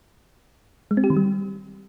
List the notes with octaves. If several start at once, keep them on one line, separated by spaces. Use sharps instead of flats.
G#3
C4
G4
D#3
G3